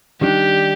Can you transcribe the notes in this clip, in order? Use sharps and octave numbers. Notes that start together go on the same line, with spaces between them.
D#3 G3 D4 G4